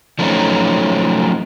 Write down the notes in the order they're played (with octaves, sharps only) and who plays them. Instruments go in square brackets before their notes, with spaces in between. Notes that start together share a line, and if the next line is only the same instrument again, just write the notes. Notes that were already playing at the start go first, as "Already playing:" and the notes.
[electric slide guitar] F3 F#3 A3 C4 C#4 D#4